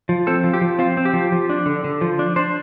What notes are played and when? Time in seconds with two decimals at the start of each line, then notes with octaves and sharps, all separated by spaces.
0.09 F3
0.27 C4 A4
0.44 F3
0.53 G4
0.61 F3
0.79 C4 F4
0.97 C4
1.05 G4
1.13 F3
1.32 F3
1.49 D4
1.66 D3
1.84 D3
2.01 F3
2.19 D4
2.36 D4 C5